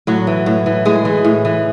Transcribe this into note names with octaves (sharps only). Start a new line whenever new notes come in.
A2 F#3 F#4
E3
A2
E3
A2 G#3 G#4
E3
A2
E3